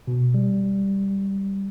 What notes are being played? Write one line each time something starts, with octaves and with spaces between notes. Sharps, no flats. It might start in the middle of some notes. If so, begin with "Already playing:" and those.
B2
G3